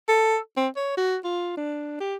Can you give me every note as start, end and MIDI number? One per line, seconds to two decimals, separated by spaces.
0.08 0.38 69
0.57 0.69 60
0.76 0.93 73
0.97 1.17 66
1.24 1.56 65
1.57 1.99 62
2.00 2.16 67